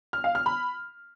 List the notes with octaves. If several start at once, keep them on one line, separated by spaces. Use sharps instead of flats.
F6
F5
F6
B5